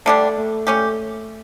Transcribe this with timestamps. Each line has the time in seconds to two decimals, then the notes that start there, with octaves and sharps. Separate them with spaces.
0.05 D3 G3 A3 D4
0.36 A3
0.67 G3 A3 C#4 G4